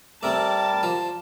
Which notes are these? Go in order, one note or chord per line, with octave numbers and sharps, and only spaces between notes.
G3 A3 C4 A#4 A5 D6
F3